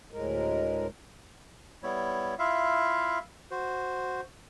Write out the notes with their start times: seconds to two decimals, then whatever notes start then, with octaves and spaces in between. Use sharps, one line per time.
0.13 D2 A2 G#3 A#4
1.83 G3 B3 E4 C#5
2.39 E4 F4 E5 F5
3.51 F#4 C5